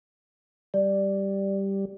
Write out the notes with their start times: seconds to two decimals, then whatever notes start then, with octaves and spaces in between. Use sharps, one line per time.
0.74 G3 D5